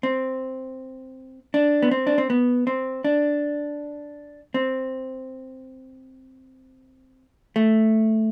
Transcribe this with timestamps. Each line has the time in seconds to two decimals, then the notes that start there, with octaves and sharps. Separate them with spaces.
0.03 C4
1.54 D4
1.83 B3
1.91 C4
2.07 D4
2.18 C4
2.30 B3
2.67 C4
3.04 D4
4.54 C4
7.56 A3